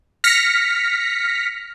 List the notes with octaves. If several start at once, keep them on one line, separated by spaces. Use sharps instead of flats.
F6 A#6 B6 C#7